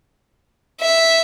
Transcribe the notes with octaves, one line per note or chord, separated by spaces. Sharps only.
E5